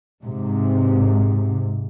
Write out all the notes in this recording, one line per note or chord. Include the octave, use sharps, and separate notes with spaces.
G#2 C3